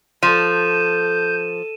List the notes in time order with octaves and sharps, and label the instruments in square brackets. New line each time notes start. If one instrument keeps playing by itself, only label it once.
[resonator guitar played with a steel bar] F3 [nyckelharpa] A4 [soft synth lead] G6 [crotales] D#7 E7